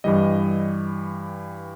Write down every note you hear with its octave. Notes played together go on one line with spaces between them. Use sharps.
G2 E3 G3 D#5